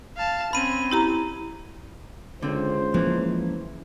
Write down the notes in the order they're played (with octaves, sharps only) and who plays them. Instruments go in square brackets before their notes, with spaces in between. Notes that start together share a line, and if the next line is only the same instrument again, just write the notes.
[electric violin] F5 A5
[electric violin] C4 C#4 [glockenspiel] B5 D#7
[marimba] E4 G4 A#5
[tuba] C#2 [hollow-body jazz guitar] D3 C4 [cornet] C5
[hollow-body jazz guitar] E3 [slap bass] F3 A#3 C#4